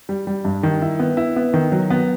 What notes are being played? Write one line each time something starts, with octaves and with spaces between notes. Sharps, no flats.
G3
G3
G2
D#3
E4
B3
E4
B3
D#3
F#3
B3